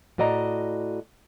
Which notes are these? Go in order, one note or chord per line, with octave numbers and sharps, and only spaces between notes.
A2 F#4 D5 D#5 A#5